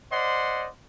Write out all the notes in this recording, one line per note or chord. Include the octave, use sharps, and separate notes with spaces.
C5 D5 D#5 F#5 C6